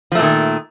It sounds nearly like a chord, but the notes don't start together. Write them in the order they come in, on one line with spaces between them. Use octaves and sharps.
F3 A3 A#2 D#3